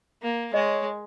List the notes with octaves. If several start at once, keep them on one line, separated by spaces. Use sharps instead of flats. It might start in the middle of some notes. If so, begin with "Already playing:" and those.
A#3
G#3 C#5 D#5